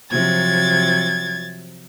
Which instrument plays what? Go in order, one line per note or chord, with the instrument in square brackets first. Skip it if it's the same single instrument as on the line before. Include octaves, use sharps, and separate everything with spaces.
[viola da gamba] C3 F3 F#3 [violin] G#6 A6